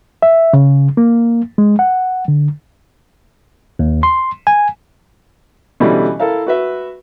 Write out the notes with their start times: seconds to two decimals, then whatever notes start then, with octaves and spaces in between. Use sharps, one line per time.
0.22 E5
0.53 C#3
0.97 A#3
1.58 G#3
1.79 F#5
2.28 D3
3.79 D#2
4.03 C6
4.47 G#5
5.80 B2 D3 E3 G3 C#4
6.19 E4 A4 A#4 F5
6.46 F#4 B4 E5